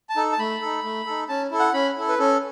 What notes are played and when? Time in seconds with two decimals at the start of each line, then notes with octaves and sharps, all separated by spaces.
0.09 A5
0.16 D#4 A4
0.32 A5
0.39 A3 B5
0.62 D#4 A4
0.84 A3
1.06 D#4 A4
1.29 C#4 A5
1.51 E4 A4
1.59 F#5
1.73 C#4 B5
1.97 E4 A4
2.09 B4
2.18 C#4 A4